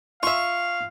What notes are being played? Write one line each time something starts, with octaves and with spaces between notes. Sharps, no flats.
F4 E5 F5 C#6